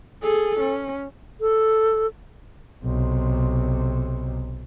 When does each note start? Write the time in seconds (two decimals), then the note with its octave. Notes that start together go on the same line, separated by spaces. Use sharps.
0.22 G#4 A4
0.60 C#4
1.41 A4
2.84 B1 C3